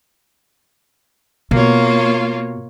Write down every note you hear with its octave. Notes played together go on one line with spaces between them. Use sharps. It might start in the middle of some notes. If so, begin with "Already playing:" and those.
B2 A#3 F4 C#5